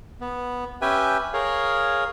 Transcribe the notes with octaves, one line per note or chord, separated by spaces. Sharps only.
B3
C#4 G4 B4 E5 G5 G#5
G#4 A#4 C#5 F5